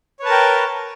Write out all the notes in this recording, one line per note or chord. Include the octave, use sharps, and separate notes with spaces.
A#4 B4 C#5 G5 A5